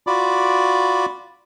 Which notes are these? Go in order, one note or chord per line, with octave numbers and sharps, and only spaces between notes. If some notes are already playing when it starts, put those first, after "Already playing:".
F4 F#4 D5 B5 D6